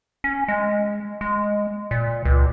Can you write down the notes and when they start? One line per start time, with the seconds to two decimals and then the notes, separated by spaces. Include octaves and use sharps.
0.24 C#4
0.48 G#3
1.21 G#3
1.91 A#2
2.25 C#2